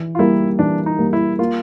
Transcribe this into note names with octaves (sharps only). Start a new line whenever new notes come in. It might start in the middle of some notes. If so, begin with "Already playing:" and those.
Already playing: E3
F4
G3 A#3 E4
E3 D4
D#4
G3 A#3
E4
A#3 F4